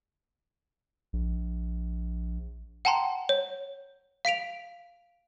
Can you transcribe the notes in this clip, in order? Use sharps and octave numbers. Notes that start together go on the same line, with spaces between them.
A#1
F#5 G5 A5 A#5 C6
C#5
F5 B6 D7 F7